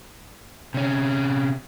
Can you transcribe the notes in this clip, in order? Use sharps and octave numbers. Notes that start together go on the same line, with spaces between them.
C3 C#4